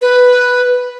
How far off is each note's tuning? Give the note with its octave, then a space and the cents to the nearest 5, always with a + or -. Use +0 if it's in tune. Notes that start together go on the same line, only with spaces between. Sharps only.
B4 +0